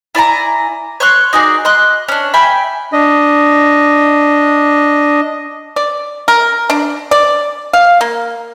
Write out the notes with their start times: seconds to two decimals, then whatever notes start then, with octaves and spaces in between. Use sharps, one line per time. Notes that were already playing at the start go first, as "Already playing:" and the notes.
0.15 E4 D5 G#5 A#5
1.00 C#5 C6 C#6 F#6
1.33 D#4 F#4 G#4 D5
1.65 D#5 C6 F#6
2.08 C#4 D4
2.34 E5 G5 G#5 B5
2.93 D4 D#5
5.76 D5
6.28 A#4
6.70 D4
7.11 D5
7.73 F5
8.01 A#3